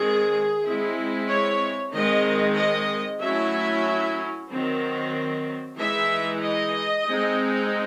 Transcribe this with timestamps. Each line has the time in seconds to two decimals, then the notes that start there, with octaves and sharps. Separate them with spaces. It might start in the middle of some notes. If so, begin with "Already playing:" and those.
Already playing: D#3 G#3 C4 G#4
0.65 G#3 C4 E4
1.29 C#5
1.94 D#3 G#3 C4 D#4 D#5
2.58 D#5
3.22 F#3 A3 C#4 E4 E5
4.50 D#3 F#3 C4
5.79 E3 G#3 D#4 E5
6.43 D#5
7.08 G#3 C4 D#4